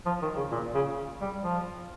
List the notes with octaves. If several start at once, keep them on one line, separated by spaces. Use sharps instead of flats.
F3
D#3
C#3
A#2
C#3
G3
F3